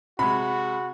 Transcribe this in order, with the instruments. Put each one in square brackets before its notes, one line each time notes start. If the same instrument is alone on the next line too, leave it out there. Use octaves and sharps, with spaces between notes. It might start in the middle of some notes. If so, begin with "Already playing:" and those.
[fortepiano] C3 G#3 [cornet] F#4 [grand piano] B5